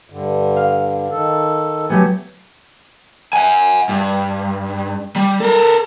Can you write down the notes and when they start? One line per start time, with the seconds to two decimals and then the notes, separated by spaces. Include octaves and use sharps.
0.10 G2 D3
0.56 F5
1.11 D#3 A4
1.90 F#3 A3 B3 G4 G#5
3.33 F#5 G#5
3.89 G2
5.16 G3
5.40 A4 A#4